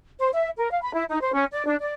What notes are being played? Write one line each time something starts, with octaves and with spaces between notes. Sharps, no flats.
C5
E5
A#4
F5
B5
E4
D#4
C5
C#4
D5
D4
D5